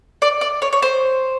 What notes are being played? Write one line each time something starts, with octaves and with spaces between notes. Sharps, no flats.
D5
D5
C#5
C#5
C5